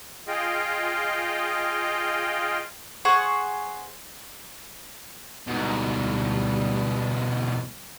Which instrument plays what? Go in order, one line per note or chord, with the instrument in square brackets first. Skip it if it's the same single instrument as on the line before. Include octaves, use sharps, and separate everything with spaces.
[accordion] F4 G#4 D#5 F5 G5
[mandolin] G#4 C5 F#5 C#6
[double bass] D2 G3 [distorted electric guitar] G#2 B2